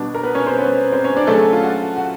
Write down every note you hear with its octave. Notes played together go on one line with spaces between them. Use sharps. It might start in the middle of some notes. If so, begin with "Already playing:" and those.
Already playing: B2 G3 B3 D4
A#4
B3 B4
C#4 C#5
C4 C5
B3 B4
C4 C5
C#4 C#5
D4 D5
C#3 F#3 A3 C#4 A4
F4
F#4
F#4